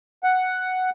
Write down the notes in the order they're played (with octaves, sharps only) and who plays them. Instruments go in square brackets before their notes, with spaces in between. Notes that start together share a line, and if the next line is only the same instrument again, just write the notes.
[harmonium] F#5